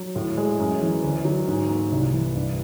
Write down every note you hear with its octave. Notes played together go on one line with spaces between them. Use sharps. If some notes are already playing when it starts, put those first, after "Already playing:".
Already playing: F#3
A2
G#3
F#2
E3
D2
F#3
G#2
A#3
C2
E3
G2